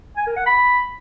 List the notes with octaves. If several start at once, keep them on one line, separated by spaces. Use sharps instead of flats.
G#5
A#4
F#5
B5